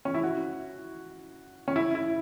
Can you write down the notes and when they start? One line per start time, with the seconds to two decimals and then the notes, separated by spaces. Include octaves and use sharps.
0.05 C#4
0.14 E4
0.23 F#4
1.68 C#4
1.76 E4
1.95 E4